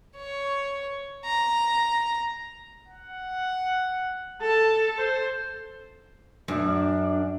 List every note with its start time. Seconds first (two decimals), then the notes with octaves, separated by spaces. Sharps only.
0.16 C#5
1.25 A#5
2.88 F#5
4.41 A4 A5
4.98 C5
6.48 F#2 D4